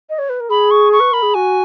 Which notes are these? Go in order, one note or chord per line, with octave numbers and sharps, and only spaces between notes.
D#5
C#5
B4
A#4
G#4 B5
C#6
C#6
B4
A#4 B5
G#4
F#4 G#5